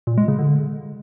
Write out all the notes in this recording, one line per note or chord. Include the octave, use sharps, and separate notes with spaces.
A#2
G#3
C#3
D3